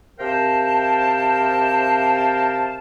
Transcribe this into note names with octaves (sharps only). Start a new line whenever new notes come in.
C3 A#4 C5 F5 G5 A5